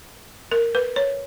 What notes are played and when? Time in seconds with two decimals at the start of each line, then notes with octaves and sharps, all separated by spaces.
0.52 A#4
0.75 B4
0.96 C#5